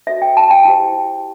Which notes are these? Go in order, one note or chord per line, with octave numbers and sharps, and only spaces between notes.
F#4 A4 C5 E5
G5
A5
G5
E4 G4 C5